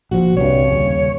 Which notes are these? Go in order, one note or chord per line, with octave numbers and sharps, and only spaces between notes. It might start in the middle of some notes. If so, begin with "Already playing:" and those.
A#1 F3 F#4
C2 G2 C#5
D#1 C#3